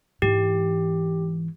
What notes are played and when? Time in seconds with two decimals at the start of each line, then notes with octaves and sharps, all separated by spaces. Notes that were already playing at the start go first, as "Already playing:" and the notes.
0.22 G#2 E3 G4